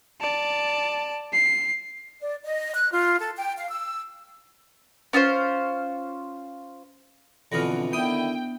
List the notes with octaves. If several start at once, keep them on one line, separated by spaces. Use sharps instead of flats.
D5 A5
C7
D5
D#5
F#6
F4
A4
G5
F5
E6
C#4 F4 A4 C5
F2 B2 D3 E3 F6 A#6
D3 D#3 B3 D4 E4 G5 D#6